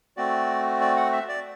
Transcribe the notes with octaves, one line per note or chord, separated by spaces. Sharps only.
A3 C4 F#4 D5
D5
F#5
E5
D5